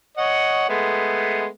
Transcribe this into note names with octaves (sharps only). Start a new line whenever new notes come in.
C#5 D#5 F#5
G#3 A3 B3